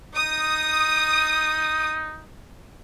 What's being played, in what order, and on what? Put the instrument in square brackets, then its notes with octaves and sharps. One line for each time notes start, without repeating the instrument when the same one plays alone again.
[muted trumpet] D#4 [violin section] D#6